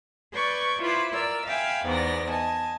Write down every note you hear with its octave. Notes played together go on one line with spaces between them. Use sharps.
B4 D5 C#6 G6 G#6
E4 F4 B4 C5 D6
A#4 D5 E6
E5 F5 G5 G#5 B5
E2 G#2 B3 D5 A#6
D#5 G#5 A5